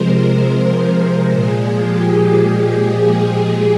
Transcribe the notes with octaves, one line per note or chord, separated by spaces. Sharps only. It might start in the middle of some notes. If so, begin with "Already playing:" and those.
Already playing: C3 F3 G#3 A#4 C5
A#4
A#2 F3 G#3 G#4
G4
G4